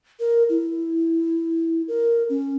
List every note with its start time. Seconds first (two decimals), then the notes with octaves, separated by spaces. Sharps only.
0.20 A#4
0.49 E4
1.88 A#4
2.29 C#4